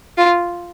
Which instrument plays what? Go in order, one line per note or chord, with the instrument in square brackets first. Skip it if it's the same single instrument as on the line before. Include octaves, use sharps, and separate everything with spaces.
[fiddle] F4